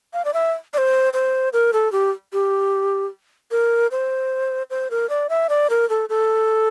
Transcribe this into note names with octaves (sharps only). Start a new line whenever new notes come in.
F5
D5
E5
D5
C5
C5
A#4
A4
G4
G4
A#4
C5
C5
A#4
D5
E5
D5
A#4
A4
A4